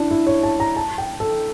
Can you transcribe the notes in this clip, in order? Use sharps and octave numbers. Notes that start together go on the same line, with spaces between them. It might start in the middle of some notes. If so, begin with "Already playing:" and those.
Already playing: D4 E4
E4
C#5
A5
A#5
A5
G5
A4